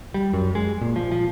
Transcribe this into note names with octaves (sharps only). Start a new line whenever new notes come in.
G3
F#2
G#3
A#2
F3
F3